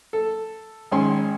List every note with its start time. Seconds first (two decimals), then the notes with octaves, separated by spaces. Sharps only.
0.13 A4
0.92 G#1 G#3 C#4 C6